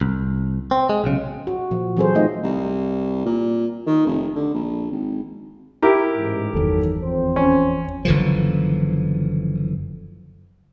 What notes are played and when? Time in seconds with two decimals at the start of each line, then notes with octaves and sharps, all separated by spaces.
0.01 C2
0.71 C4
0.89 G#3
1.04 B1 C#3
1.47 F#4
1.71 A#2 F3
1.97 E3 F#3 C4 G#4 A4 C5
2.15 A3 D#4 F4 D#5
2.43 C2
3.26 A#2
3.86 D#3
4.07 F1
4.36 D3
4.54 A#1
4.91 G#1
5.82 E4 G4 A#4
6.18 A1 G#2
6.53 G1 E2 D#3 F#3 A4
7.03 F2 C4 C5
7.36 C#4
8.05 F#1 D3 E3 F3